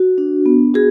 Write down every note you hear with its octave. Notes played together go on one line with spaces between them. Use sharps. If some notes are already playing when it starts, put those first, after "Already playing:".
Already playing: F#4
D4
B3
F#4 G#4